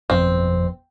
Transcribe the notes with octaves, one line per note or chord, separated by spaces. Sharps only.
G1 F2 B2 C4